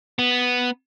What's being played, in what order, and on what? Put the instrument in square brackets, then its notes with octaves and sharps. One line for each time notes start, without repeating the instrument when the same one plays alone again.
[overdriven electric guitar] B3